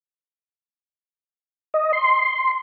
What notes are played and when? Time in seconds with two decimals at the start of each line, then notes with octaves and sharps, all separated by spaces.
1.74 D#5
1.93 C6